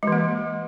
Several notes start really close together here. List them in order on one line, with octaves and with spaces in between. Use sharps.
G#3 E3 A#3